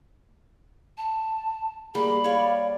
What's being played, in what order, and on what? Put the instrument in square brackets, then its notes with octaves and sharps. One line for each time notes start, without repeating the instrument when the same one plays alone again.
[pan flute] A5
[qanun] G3 A#3 [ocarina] G#4 [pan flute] B5
[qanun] C#5 D5 [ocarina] F5